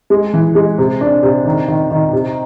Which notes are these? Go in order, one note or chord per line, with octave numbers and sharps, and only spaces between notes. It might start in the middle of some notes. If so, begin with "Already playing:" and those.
G#3
E3
G#3
C3
D4
C3
D#3
D#3
D#3
C3